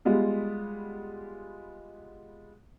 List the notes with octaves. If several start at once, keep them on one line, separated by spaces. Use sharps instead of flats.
G3 G#3 B3 F4